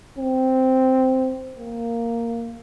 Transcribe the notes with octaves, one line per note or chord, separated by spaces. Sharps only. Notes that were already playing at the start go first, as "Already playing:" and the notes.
C4
A#3